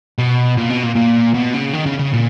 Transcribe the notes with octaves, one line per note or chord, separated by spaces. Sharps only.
B2
A#2
B2
A#2
A#2
B2
C#3
D#3
C#3
C#3
A#2